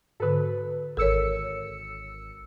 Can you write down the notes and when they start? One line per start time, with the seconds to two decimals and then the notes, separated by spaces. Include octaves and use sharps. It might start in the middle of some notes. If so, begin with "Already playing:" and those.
0.20 G#2 D3 A4 B4
0.97 G#1 A4 A#4 C#5 E6 C#7